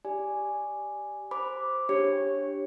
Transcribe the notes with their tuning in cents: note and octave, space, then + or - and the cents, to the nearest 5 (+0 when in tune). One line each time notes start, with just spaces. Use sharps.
G4 +0 D5 +0 G#5 +0
C5 +0 B5 +0 D6 -5
D4 +0 G4 +0 C#5 -15